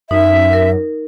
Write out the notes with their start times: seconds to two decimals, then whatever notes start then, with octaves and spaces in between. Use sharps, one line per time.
0.11 F#2 D#4 E5
0.53 A#4